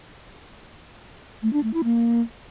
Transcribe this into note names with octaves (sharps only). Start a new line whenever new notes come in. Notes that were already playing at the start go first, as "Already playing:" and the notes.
A3
D4
A3
E4
A#3